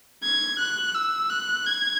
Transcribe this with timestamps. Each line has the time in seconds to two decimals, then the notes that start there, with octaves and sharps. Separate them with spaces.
0.23 G#6
0.59 F#6
0.95 E6
1.30 F#6
1.67 G#6